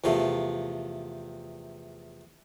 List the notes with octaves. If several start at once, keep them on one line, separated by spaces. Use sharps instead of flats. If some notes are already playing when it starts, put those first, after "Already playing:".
E2 C3 F3 A3